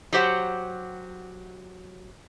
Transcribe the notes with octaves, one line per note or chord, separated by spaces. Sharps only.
F#3 G4 C5 F#5